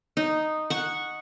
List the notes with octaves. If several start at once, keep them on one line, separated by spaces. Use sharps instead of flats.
D#4
F#5 C#6